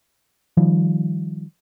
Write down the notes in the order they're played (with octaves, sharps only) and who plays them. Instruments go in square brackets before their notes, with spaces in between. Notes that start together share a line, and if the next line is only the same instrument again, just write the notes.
[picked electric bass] D#3 F3 G3